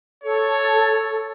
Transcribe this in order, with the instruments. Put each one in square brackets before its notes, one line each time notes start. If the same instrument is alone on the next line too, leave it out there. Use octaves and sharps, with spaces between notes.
[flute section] A4 [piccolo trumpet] C#5